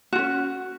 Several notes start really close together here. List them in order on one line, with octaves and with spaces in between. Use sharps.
F#4 F4 C#4